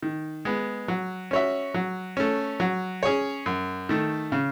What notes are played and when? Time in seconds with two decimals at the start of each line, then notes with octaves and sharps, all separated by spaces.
0.03 D#3
0.45 G#3 B3
0.88 F#3
1.31 C#4 F#4 C#5 E5
1.74 F#3
2.17 A3 C#4
2.60 F#3
3.03 C#4 G#4 C#5
3.46 F#2
3.89 D#3 A3
4.32 C#3